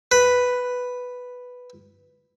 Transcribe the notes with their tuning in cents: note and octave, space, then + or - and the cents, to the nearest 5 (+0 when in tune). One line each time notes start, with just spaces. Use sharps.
B4 +0